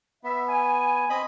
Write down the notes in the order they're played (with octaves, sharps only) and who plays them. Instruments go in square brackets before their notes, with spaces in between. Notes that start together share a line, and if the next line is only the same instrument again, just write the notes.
[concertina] B3 [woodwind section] E5
[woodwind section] G#5
[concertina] C4 D#5 B5